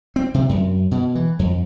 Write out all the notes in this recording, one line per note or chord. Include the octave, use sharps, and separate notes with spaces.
C4
C3
F#2
B2
E3
F2